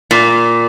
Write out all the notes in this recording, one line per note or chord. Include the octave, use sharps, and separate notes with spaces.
A#2